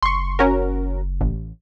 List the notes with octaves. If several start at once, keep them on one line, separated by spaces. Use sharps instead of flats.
F#1 C6 C#6
C#4 F#4 A#4
A1